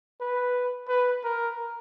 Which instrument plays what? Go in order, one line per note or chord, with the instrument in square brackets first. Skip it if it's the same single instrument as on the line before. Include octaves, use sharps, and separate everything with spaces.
[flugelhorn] B4
B4
A#4